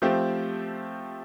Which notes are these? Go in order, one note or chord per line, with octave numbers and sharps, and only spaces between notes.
F3 A3 C4 G4